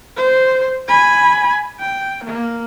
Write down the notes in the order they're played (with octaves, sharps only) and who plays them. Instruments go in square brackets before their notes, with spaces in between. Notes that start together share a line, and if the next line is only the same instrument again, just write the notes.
[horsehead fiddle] C5
G#5 B5
G5
A#3